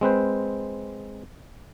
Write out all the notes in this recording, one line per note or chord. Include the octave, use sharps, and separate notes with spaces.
G#3 C4 B4 C5